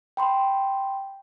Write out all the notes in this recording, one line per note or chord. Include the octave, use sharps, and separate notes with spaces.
G5 B5 C6